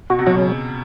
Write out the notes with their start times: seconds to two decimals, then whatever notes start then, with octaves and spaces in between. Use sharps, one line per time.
0.10 B2 F#4
0.19 C3
0.26 B2 F#3
0.37 C#3